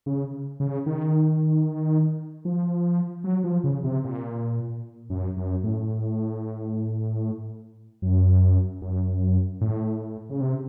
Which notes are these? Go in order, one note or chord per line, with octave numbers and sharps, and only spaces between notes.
C#3
C#3
D#3
F3
F#3
F3
C#3
C3
A#2
F#2
F#2
A2
F#2
F#2
A2
C#3
C3